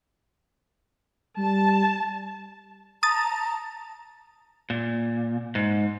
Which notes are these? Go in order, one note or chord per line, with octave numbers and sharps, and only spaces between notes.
G3 A5
A5 A#5 D#6 A6
A#2
G#2